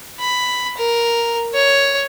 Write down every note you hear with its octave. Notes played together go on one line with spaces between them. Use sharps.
B5
A#4
C#5